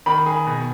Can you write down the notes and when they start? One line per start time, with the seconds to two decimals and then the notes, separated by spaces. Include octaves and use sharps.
0.06 D#3 B5
0.26 G#4
0.47 B2